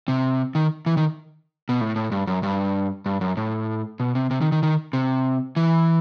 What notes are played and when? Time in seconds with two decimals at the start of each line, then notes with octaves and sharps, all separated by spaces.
0.08 C3
0.55 D#3
0.86 E3
0.97 D#3
1.69 B2
1.81 A2
1.96 A2
2.12 G2
2.27 F#2
2.43 G2
3.06 G2
3.21 F#2
3.37 A2
4.00 B2
4.15 C3
4.31 C3
4.41 D#3
4.52 D#3
4.63 D#3
4.93 C3
5.56 E3